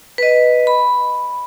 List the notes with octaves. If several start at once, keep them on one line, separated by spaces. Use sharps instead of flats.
B4 D#5
B5